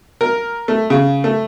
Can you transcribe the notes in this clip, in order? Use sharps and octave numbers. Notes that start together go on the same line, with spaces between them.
A#4
A3
C#3
A3